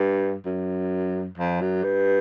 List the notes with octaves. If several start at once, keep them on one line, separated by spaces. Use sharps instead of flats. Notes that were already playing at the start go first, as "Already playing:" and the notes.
Already playing: G2
F#2
F2
F#2
G2